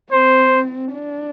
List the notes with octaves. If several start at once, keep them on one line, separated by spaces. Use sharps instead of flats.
C4 C5
D4